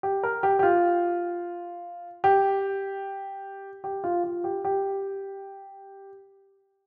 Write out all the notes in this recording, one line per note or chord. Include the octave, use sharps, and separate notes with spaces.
G4
A#4
G4
G4
F4
G4
G4
F4
F4
G4
G4